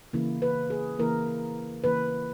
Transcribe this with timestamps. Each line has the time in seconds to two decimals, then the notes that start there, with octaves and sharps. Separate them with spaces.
0.13 C#3 E3 A#3 E4
0.42 B4
0.70 G#4
0.99 C#3 E3 A#3 E4 A#4
1.84 C#3 E3 A#3 E4 B4